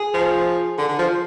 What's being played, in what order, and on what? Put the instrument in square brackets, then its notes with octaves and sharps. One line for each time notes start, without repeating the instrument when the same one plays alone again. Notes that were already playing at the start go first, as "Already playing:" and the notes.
Already playing: [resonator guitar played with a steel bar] G#4
[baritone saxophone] F3
D3
D3
F3